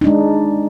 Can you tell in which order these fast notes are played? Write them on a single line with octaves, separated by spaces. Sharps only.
D#4 D4 G#3